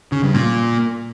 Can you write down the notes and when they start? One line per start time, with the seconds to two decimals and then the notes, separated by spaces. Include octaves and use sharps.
0.12 C#3
0.23 G2
0.34 A#2